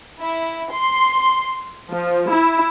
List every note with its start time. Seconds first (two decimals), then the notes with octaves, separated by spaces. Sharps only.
0.20 E4
0.71 C6
1.91 F3
2.29 E4